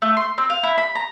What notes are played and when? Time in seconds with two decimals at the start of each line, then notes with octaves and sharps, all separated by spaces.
0.02 A3
0.17 C6
0.38 C4
0.50 F5
0.63 E4
0.78 B5
0.95 A#5